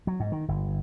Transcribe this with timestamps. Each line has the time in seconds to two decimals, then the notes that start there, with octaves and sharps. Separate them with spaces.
0.07 F#3
0.20 G#2
0.32 D#3
0.48 G1